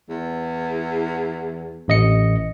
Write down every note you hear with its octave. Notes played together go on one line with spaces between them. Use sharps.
E2
A1 D#5 C#7